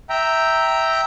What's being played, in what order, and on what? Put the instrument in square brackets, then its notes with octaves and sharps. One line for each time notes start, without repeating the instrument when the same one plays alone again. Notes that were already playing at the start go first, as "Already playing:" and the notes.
[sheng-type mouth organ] E5 G5 A#5